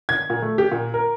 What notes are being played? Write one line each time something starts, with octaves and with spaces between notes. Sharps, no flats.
G#6
A#2
A3
G4
A#2
A#4